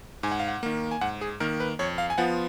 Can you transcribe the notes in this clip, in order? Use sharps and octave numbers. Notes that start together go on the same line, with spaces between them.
G#2 G#5
F#5
F5
F#5
D#3 A#3
G#5
G#2 F#5
G#4
D#3 A#3 A#4
B4
F2 C#5
F5
G#5
F3 B3 F4 F#5